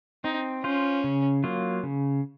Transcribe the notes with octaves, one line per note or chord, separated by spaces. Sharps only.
C4 D#4
C#4 F4 C5
C#3
F#3 A#3 F4
C#3